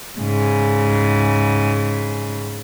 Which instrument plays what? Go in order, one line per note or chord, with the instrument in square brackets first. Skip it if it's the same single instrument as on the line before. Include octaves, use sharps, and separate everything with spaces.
[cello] G#2 C#3